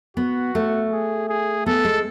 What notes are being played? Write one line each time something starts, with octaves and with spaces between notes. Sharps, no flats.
B3 F#4
A3
G#4
G#4
B3 A4
G#3